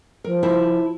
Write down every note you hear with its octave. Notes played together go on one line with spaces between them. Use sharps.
F3 A#4
E4 C5 A5